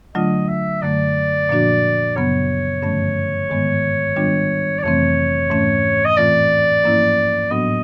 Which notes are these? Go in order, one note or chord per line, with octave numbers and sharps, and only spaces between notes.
D3 F#3 A3 D4 F4 D#5
E5
F#2 D3 F#3 A3 D5
A#2 F3 A#3 D4 F#4
F#2 C#3 F#3 B3 C#5
G2 D3 F3 A3 C#4
G#2 D#3 G#3 B3
D#3 G3 B3 D4 F4
D5
F2 C3 E3 A3 C4 C#5
G#2 E3 A3 C#4
D#5
A2 E3 A3 C4 F4 D5
G#2 F3 A#3 C#4 E4
A2 F#3 B3 D4 F#4 D#5